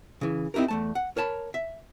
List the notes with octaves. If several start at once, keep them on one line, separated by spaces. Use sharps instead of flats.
C#3 E3
C4 D#4 E4 G4 A#4
E2 A3 A5
F#5
A#4 C#5 A5 B5
E5